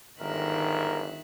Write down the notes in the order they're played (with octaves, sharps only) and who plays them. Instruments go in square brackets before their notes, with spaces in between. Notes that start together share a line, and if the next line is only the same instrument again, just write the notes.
[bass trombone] G1 [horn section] G#2 A#4 [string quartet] D#3 E5 F#6